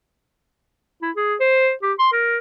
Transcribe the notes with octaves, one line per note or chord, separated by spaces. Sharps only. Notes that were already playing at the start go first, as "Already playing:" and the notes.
E4
G#4
C5
G4
C6
A#4